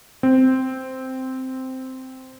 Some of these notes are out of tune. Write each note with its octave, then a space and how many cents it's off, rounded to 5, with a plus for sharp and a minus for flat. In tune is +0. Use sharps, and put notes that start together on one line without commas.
C4 -5